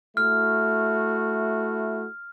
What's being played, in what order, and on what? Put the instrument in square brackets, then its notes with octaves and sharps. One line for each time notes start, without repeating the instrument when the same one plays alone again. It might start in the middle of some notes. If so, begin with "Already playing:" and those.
[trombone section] A3 E4 F#4 [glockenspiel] F6